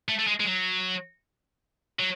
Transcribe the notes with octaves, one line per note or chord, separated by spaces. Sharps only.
A3
A3
G#3
G#3
F#3
F#3